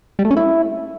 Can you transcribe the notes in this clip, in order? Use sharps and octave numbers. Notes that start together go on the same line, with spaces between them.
G3
A3
C#4
E4